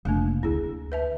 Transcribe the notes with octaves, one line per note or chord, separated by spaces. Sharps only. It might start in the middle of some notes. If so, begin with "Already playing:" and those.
F1 A3 A#3 D4
D2 E4 G#4
B4 E5 A5